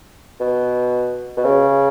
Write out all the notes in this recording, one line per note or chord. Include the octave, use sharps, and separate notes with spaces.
B2
B2
C#3